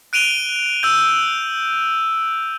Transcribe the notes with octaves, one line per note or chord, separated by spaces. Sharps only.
F#6 D7 D#7 F7 G7
E6 G6